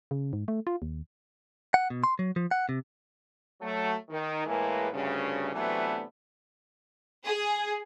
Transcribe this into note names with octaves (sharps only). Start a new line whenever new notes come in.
C#3
G#2
A3
F4
D#2
F#5
B2
C6
F#3
F3
F#5
C3
F#3 A3
D#3
A2 E3 G#3 A#3 G#4 B4
D2 G2 C#3
C3 E3 F#3 A3 B3 D4
G#4